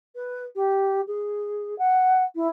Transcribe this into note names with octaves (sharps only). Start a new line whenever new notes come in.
B4
G4
G#4
F#5
E4